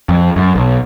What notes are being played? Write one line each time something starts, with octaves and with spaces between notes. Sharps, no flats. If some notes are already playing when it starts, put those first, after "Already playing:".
F2
F#2
B1